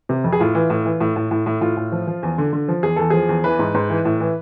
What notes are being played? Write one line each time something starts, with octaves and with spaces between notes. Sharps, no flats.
C3
F2
G#4
A2 F4
E3
A2
E3
A2
A2
A2
A2
A2 F4
A2
F3
F3
E2
D3
D3
F3
E2 G#4
E2 A4
F3 G#4
E2
E3 B4
G#2
G#2
E3
A2
E3